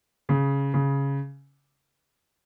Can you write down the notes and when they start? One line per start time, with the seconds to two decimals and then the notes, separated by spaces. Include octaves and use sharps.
0.29 C#3
0.74 C#3